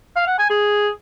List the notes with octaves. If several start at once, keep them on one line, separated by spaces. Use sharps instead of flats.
F5
F#5
G#5
G#4